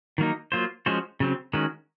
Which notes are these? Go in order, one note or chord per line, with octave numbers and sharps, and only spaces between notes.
D#3 F#3 A#3 D#4
F#3 A#3 F4 C5
F3 G#3 C#4 F#4 C5
C#3 F#3 C4
D#3 G#3 C#4 F#4